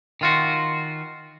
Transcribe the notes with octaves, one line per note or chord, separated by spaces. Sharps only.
D#3 F4 F#4